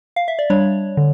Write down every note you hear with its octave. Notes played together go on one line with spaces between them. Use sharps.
F5
E5
D5
G3 D4 C#5
D3